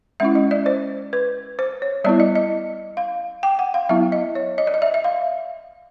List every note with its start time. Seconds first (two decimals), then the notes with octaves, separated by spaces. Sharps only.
0.20 G#3 C#4 E4 E5
0.35 D#5
0.51 D5
0.66 C5
1.13 B4
1.59 C5
1.82 C#5
2.04 G3 B3 E4 D5
2.20 D#5
2.35 D#5
2.97 F5
3.43 G5
3.59 F#5
3.74 F5
3.89 F#3 B3 E4 E5
4.12 D#5
4.35 C#5
4.58 D#5
4.67 D5
4.74 D#5
4.82 E5
4.94 E5
5.04 F5